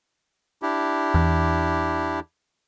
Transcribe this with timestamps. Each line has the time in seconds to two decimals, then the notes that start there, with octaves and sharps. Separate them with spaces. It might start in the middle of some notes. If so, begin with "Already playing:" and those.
0.62 D4 E4 G4
1.14 E2